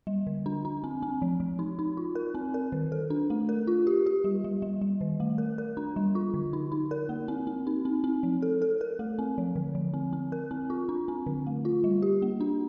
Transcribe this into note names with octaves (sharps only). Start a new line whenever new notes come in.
G3
D3
D4
D4
C4
C4
F3
F3
D#4
D#4
F4
A#4
C4
A#4
D#3
A4
D4
A3
A#4
F4
G4
G4
G3
G3
G3
G3
D#3
A3
A#4
A#4
D4
G3
F4
D3
D#4
D#4
A#4
A#3
C4
C4
D#4
C4
C4
F3
A4
A4
A#4
A3
C4
F3
D3
F3
C4
C4
A#4
C4
F4
D4
C4
D3
A3
F4
G3
G4
A#3
D4